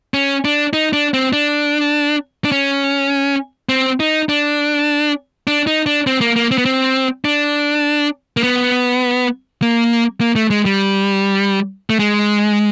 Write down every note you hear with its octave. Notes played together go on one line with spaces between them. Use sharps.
C#4
D4
D#4
D4
C4
D4
D4
C#4
C4
D#4
D4
D4
D#4
D4
C4
A#3
A#3
C4
B3
C4
D4
A#3
B3
A#3
A#3
A3
G#3
G3
A3
G#3